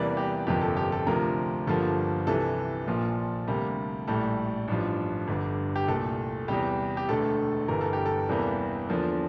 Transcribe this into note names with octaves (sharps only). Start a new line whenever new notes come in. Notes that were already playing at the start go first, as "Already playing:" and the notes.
Already playing: E2 C3 E3 G3 A#3 D5
G4
G1 F2 C3 F3 A#3 G4
A4
G4
A4
D2 C3 F3 A#4
G1 G2 F3 A#3 A4
C2 C3 E3 A4
A#1 A#2 F3
D2 C3 G3 A#3
A#1 A2 G3 A4
A1 G2 F3
G1 G2 D3
G4
C2 A#2 A3 A4
E2 C3 G3 G4
G4
E1 D2 D3 A3 A4
G1 G2 E3 A3 A#4
A4
G4
A4
E2 C3 E3 G3 A#3
E2 D3 F3 A#3